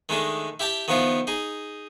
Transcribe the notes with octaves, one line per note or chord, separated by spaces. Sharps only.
D#3 G#3 A3 D4
E4 G4 G5 A5
D#3 F3 B3 E4 F4
D#4 G#4